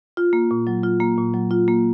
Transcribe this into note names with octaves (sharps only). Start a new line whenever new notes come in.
F4
A#3
A#2
F#3
F4
A#3
A#2
F#3
F4
A#3